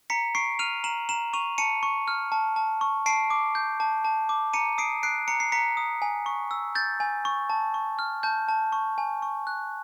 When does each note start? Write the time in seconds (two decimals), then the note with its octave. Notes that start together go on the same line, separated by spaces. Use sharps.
0.10 A#5 B6 C#7
0.35 C#6 C7 D7
0.59 F6 D#7 F7
0.84 A#5 E7 F#7
1.09 A#5 E7 F#7
1.33 C#6 D#7 F7
1.58 A5 C#7 D#7
1.83 C#6
2.08 F6
2.32 A5
2.56 A5
2.81 C#6
3.06 A5 C7 D7
3.30 D6
3.55 G6
3.80 A5
4.05 A5
4.29 D6
4.53 A#5 C#7 D#7
4.78 D#6 C7 D7
5.03 F#6 C7 D7
5.28 A#5 C#7
5.40 C7
5.52 A#5 B6 C#7
5.77 D#6
6.02 G#5
6.26 C#6
6.51 E6
6.75 G6 A6
7.00 G#5
7.25 C#6
7.50 A5
7.74 C#6
7.99 F6
8.23 A5 G6
8.48 A5
8.72 C#6
8.98 G#5
9.22 C#6
9.47 F#6